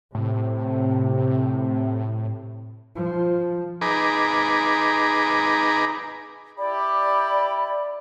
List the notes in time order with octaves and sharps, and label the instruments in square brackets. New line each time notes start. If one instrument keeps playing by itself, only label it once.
[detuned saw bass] A2 [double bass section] C3
[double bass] F3
[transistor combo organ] D#4 G#4 B4 A#5 D6
[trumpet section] E4 G4 [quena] D5 [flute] B5